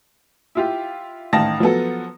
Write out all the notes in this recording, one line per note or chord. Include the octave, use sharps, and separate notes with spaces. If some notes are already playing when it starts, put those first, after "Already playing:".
E4 F4 G4
A1 D#3 F5 A5 A#6
F3 F#3 B3 A4